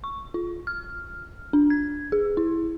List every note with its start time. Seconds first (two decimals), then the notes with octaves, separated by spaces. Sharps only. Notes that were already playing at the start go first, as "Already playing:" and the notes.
0.04 C#6
0.34 F4
0.67 F6
1.53 D4
1.70 G#6
2.12 G#4
2.37 E4